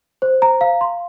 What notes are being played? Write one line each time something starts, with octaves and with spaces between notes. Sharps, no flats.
C5
A#5
F5
C6